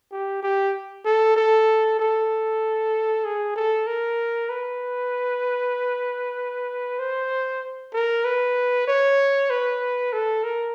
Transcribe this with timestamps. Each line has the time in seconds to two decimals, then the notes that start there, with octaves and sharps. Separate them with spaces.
0.12 G4
0.43 G4
1.05 A4
1.36 A4
1.99 A4
3.25 G#4
3.55 A4
3.87 A#4
4.49 B4
6.99 C5
7.94 A#4
8.25 B4
8.87 C#5
9.50 B4
10.13 A4
10.44 A#4